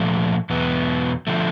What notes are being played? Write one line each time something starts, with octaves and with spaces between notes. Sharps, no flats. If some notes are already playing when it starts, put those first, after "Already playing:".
Already playing: A#2 F3 A3
E2 B2 F#3 B3
D3 F3 A3